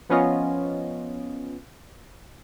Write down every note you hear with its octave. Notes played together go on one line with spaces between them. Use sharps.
F3 B3 C#4 F4 D#5